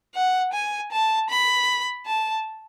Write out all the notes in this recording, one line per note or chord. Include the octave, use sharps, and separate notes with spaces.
F#5
G#5
A5
B5
A5